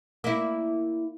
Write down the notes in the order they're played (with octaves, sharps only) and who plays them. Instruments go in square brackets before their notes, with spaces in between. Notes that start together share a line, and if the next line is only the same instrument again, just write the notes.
[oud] A#3 E4